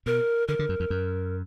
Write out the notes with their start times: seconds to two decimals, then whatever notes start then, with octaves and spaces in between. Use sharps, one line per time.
0.06 B2 A#4
0.48 D3 A#4
0.59 D3
0.69 F#2
0.80 F2
0.90 F#2